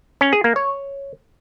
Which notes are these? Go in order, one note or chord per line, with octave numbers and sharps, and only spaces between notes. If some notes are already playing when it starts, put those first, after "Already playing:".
C#4
G#4
A#3
C#5